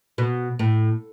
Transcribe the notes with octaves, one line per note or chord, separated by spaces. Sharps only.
B2
A2